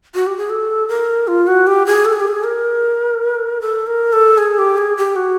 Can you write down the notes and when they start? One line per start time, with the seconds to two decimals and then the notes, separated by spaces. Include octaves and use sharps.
0.15 F#4
0.27 G4
0.38 G#4
0.50 A4
0.89 A#4
1.28 F4
1.47 F#4
1.67 G4
1.87 G#4
2.05 A4
2.13 G#4
2.20 G4
2.28 G#4
2.44 A#4
3.61 A4
3.87 A#4
4.13 A4
4.38 G#4
4.58 G4
4.78 G#4
4.97 G4
5.16 F#4